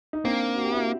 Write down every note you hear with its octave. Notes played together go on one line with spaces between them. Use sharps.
D#4
A#3 C4 D4
F#4
G4
E4 F#4